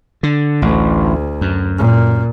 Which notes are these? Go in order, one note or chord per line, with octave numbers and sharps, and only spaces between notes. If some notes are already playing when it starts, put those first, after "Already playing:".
D3
A1 D2
F#2
A#2